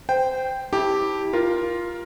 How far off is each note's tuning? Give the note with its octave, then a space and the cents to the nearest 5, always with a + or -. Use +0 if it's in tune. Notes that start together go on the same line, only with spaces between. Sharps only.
C5 -20 G5 +0
E4 -30 G4 +0 A5 +0
F4 +0 A#4 +15